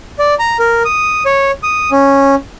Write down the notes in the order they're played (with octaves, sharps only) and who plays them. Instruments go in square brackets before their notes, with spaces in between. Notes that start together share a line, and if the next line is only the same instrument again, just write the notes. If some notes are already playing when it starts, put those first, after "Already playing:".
[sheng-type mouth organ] D5
A#5
A#4
D#6
C#5
D#6
C#4